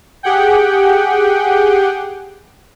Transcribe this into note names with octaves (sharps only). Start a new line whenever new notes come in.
G4 G#4 F#5 G5